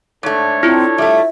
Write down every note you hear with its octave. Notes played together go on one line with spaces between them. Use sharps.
G#2 A3 D4 A4 C#5
C4 E4 F4
G3 A3 E5